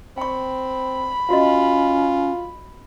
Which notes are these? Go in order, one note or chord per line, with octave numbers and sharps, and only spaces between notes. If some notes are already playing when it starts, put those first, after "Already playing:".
C4 G5 B5 C#6
C#4 F4 F#4 D#5